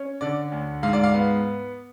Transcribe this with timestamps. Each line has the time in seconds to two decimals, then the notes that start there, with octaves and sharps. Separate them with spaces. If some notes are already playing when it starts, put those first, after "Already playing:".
Already playing: C#4
0.21 D3 D5
0.52 D2
0.83 G#2 F5
0.93 D5
1.03 F5
1.14 B3